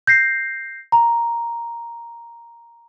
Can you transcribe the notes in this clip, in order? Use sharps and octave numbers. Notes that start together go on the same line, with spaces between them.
G6 A#6 C7
A#5